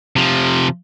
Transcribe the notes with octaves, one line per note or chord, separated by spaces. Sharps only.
C3 F3